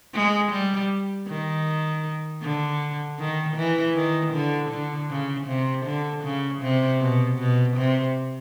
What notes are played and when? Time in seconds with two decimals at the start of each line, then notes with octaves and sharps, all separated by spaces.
0.14 G#3
0.52 G3
1.28 D#3
2.42 D3
3.19 D#3
3.56 E3
3.96 D#3
4.34 D3
4.71 D3
5.10 C#3
5.47 C3
5.86 D3
6.24 C#3
6.62 C3
7.01 B2
7.39 B2
7.77 C3